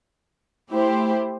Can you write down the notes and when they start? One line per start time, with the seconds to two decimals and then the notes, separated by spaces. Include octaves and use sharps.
0.72 A3 E4 G4 C5